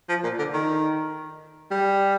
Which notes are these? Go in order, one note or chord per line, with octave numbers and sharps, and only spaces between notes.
F3
A#2
D3
D#3
G3